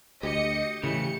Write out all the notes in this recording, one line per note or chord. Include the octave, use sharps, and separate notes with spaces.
D2 G4 D#5 C#7
A2 C#3 E3 C#7